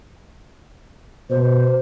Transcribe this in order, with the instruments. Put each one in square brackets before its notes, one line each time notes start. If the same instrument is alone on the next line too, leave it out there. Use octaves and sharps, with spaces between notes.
[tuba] B2 [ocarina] C5